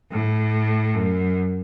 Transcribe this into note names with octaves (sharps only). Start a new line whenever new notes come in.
A2
F#2